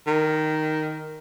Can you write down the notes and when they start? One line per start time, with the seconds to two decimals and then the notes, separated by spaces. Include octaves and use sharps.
0.07 D#3